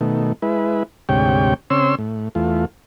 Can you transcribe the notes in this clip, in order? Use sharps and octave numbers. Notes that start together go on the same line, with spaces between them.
B2 D#3 A3
G#3 E4 B4
D2 G#2 C3 G4 C#5 G5
C#3 C4 C#5 C6 E6
A2
E2 A3 F4